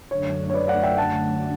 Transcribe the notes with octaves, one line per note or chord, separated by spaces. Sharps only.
F#2 D3 F#3 A3 D4 C#5
C#5
B4 D5
D5 F#5
E5 G5
F#5 A5